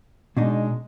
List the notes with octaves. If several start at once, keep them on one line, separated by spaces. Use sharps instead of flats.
B2 G#3 D4 D#4